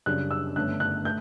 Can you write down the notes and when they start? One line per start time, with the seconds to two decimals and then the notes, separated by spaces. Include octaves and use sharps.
0.06 F#2 C#3 G3 D4 F#6
0.31 E6
0.56 G1 G2 D3 A3 C#4 F#6
0.80 F#6
1.05 A3 G6